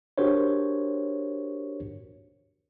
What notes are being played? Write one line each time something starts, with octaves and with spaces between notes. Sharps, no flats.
D4 F#4 G4 A#4 C5 C#5